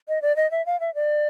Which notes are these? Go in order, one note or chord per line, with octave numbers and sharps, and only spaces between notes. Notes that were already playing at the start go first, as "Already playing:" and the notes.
D#5
D5
D#5
E5
F5
E5
D5